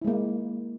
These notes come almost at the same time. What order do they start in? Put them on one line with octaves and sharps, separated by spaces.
E4 G#3 A#3